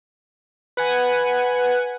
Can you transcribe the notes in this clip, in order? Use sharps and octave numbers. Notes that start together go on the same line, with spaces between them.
B4 F#5 G#5